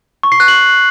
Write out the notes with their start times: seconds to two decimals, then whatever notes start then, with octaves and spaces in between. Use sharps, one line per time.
0.23 C#6
0.32 C7
0.40 F#6
0.48 F#7